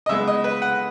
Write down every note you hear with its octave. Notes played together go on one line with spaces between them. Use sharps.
D#5
C#3 G#3 B3 E5
D#5
B4
F#5